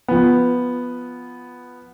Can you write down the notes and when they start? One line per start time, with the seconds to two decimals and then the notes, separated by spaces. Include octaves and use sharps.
0.08 F3 B3